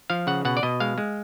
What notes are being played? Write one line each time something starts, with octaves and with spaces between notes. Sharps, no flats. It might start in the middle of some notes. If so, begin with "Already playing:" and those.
F3 F5
C#3 F#5
B2 F#5
D5
B2 D#5
G#3 F5
G#3